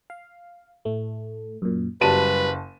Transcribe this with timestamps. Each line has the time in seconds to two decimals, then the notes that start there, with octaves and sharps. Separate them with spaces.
0.10 F5
0.85 A2 A3
1.62 F#2 A#2
2.01 F#1 F#3 G3 B4 A5 D#7